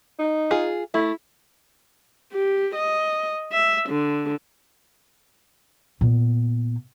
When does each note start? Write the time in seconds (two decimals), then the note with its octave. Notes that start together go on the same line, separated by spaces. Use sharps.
0.19 D#4
0.51 F4 G#4
0.94 A3 E4
2.33 G4
2.76 D#5
3.52 E5
3.89 D3
6.01 A#2 B3